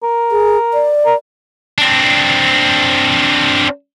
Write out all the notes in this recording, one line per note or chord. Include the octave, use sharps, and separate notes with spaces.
A#4
G#4
D5
A#4
C4 D4